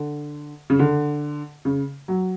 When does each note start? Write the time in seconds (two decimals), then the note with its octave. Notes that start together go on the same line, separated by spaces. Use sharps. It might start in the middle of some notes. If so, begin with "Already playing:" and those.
Already playing: D3
0.70 C#3
0.79 D3
1.65 C#3
2.08 F#3